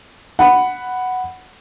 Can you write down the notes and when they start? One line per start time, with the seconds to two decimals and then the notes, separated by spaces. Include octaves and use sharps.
0.39 F#5 B5